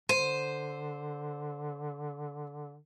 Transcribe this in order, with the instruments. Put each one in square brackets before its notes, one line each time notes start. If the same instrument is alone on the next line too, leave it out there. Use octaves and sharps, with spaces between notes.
[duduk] D3 [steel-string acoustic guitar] C5 [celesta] D#7